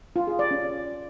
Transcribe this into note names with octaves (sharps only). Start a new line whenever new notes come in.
F4
G#4
D5
C#4